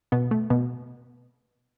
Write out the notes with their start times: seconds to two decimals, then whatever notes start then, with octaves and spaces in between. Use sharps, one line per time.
0.12 B2 B3
0.31 A3
0.50 B2 B3